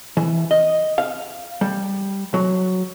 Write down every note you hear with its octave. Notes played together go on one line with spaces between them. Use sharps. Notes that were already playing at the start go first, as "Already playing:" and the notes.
E3
D#5
F5
G3
F#3